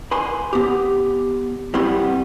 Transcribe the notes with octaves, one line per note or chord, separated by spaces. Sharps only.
B4 G#5 C6
B3 G4
G3 B3 C4 E4 C6